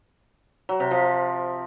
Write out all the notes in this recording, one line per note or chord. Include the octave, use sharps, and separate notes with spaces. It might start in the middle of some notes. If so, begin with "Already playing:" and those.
F#3
C3
F3